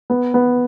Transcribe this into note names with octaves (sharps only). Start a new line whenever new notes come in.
B3
B3